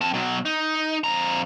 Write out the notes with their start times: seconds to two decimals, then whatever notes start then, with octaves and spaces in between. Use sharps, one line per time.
0.01 C4 A5
0.14 B2 F#3
0.45 D#4
1.04 F2 A#5